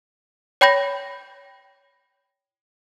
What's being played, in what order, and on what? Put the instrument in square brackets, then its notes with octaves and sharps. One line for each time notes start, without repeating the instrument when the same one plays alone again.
[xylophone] C#5 G5 B5 G6 A#6